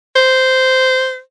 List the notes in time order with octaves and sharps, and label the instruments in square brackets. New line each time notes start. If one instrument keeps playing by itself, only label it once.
[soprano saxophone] C5